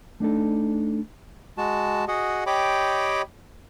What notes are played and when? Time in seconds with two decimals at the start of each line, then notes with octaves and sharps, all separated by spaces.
0.20 A3 D4 D#4 A4
1.58 G#3 F#4 A5
2.08 F#4 G#4 D#5 F#5
2.47 G4 C#5 D#5 G5 B5 D6